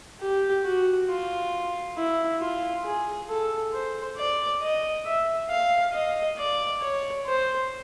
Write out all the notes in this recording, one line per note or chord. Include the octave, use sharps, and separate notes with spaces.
G4
F#4
F4
E4
F4
G#4
A4
C5
D5
D#5
E5
F5
D#5
D5
C#5
C5